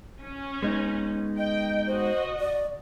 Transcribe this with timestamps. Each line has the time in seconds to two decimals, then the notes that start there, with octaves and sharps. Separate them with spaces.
0.20 C#4
0.63 G#3 B3 D#4
1.38 D#5 G5
1.87 F#4 C5 D#5
2.39 D5